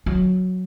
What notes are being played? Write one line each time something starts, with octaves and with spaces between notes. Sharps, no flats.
F#3